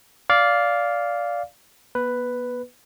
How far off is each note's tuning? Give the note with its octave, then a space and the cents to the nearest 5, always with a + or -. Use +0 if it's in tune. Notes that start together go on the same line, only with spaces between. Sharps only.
D5 -15 F5 +0
B3 -35 B4 +5